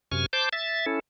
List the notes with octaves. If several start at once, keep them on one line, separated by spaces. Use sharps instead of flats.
F#2 C3 G#5 C#6 F6
C5 A5 D6 G6
E5 A6
C#4 E4 A4